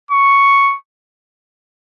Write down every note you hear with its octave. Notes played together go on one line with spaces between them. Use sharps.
C#6